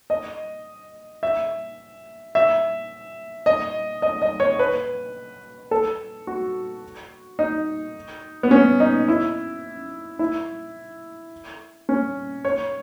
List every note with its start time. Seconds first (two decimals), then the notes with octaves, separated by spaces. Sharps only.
0.10 D#5
1.23 E5
2.35 E5
3.46 D#5
4.02 D#5
4.22 D#5
4.40 C#5
4.59 B4
5.71 A4
6.27 F#4
7.39 D#4
8.43 B3
8.51 C#4
8.80 D#4
9.08 E4
10.19 E4
11.89 C#4
12.45 C#5